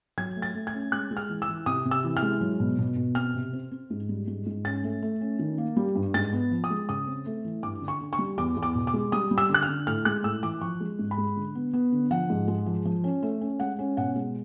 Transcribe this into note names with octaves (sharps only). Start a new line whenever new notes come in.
F#3 G#6
A3
A6
A3
G#6
C#4
G#3 F#6
G#3
F6
E3
E6
E3
C3 D#6
C3
E6
E3
F6
G#3
F#3
B2
B2
B2
C4 F6
C3
C4
C4
G#2
G3
G#2
G#2
C#4 A6
A3
A3
C#4
D#3
A#3
G3
G2
G#2 A6
B3
F3
D#6
G#3
C#3 D#6
C4
A3
E3
G2 D6
D3
C#6
D3
C#6
G3
E2 D6
E2
D6
B2
D6
G#3
G3 D#6
G3
E6
D3
F#6
F6
D3
A2 F6
G#3 F#6
A2 E6
E3 D6
F3 C#6
G#3
G#2
B5
G#3
D3
B3
B3
D3
F3 F#5
G#2
G#3
F3
F3
C#4
A3
C#4
G#3 F#5
C#4
B2 F#5
G#3